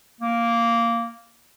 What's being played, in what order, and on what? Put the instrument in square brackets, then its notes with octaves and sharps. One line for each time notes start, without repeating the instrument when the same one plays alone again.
[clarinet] A#3